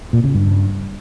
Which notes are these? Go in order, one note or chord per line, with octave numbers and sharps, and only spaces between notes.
A#2
C#3
G2